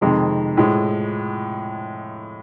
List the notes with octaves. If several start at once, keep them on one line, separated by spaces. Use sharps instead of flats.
F2 C3 D#3 G#3
A2 F3 G#3